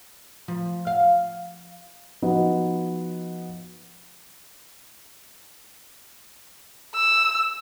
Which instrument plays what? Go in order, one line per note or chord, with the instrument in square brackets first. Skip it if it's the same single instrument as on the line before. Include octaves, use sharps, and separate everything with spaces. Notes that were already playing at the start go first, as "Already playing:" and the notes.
[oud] F3
F5
[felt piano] F3 B3 D#4 F#4 D#5
[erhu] E6